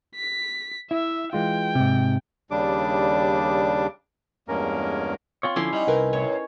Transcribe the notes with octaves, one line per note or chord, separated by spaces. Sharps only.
B6
E4 E5
E3 G#3 F4 G5
G#2 C3
D#2 C#3 G3 D4 D6
E2 G2 G#3 A#3 C#4 A#4
C4 F4 C#5
D3 F3 C#4 E4 C6 D6 C7
G3 D#4 D#5 F#5
C2 A#4 B4 G5
A2 C#5